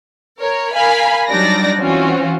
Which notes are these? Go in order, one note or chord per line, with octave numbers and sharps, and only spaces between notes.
A#4 C#5
A#4 F5 G#5 B5
F#3 G3 D4 D#4 D5 A#6
E3 C4 C#4 F4 F#4